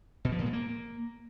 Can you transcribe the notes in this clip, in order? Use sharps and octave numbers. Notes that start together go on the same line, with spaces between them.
B2
F3
A#2
G#3
A#3